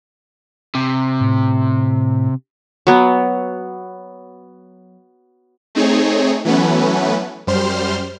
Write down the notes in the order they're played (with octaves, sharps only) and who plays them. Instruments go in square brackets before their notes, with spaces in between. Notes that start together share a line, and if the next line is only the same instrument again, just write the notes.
[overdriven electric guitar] C3
[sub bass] A2
[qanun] F#3 B3
[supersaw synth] A3 C4 D#4 G#4 C#5
E3 F#3 A3 B3 C#4 B4
F#2 G3 C5 C6 F6